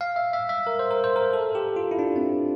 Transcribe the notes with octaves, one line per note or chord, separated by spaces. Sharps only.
F5
E5
E5
E5
A#4
C5
A#4
C5
A#4
A4
G4
F4
E4
D4
C4